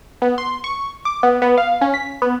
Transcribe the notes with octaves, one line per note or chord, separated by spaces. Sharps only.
B3
C6
C#6
D6
B3
B3
F5
C#4
B6
B3